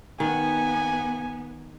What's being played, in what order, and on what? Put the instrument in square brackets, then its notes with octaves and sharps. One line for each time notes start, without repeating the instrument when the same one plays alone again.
[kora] D#3 [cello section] B3 [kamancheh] G#5